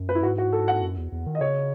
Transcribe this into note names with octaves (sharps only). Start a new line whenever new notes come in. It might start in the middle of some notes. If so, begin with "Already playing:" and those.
Already playing: F#2
B4
E4
G#2 F#4
F#4
A4
F#5
F#2
E2
E2
D#3
D#5
C#3 C#5